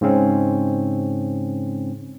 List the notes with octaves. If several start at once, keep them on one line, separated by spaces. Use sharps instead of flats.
G#2 C#3 C4 C#4